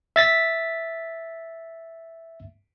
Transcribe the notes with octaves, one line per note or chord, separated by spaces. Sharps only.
E5 A6 B6